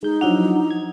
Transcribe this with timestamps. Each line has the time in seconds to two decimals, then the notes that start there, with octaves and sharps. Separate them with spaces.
0.03 G#3 D#4 G6
0.21 F3 F#3 D4 E4 F#5
0.71 G#6